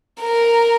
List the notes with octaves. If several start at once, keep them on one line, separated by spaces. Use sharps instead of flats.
A#4